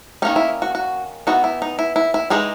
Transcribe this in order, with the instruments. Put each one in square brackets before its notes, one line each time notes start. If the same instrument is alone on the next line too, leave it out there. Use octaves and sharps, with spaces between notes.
[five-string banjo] D#3 A#3 C#4 D#4
E4
F#4
F#4
E3 B3 D#4 F#4
E4
D#4
E4
E4
E4
E3 G#3 D#4 G#4